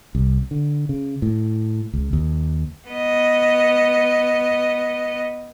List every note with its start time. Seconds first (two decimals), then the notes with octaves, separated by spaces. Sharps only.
0.15 C2
0.51 D3
0.89 C#3
1.22 A2
1.94 C#2
2.13 D#2
2.87 B3 D#5